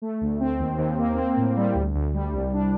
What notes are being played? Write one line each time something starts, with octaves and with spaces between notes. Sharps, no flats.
A3
D2
C4
D#2
D#2
A#3
C4
A2
G3
D2
D2
G3
C2
D4